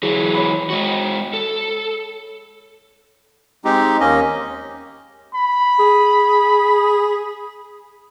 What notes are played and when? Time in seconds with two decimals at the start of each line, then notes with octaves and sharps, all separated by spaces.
0.03 E3 F#3 G#4
0.35 C#5 B5
0.70 G#3 F#4
1.33 A4
3.65 G#3 C4 D#4 G4
4.00 D#2 A#3 C#4 D#5
5.35 B5
5.80 G#4